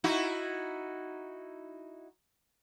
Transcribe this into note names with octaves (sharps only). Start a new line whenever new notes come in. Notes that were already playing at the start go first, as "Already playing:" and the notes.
D#4 E4 F#4